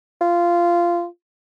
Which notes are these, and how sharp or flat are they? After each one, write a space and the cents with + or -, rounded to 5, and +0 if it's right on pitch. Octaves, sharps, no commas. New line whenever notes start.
F4 -15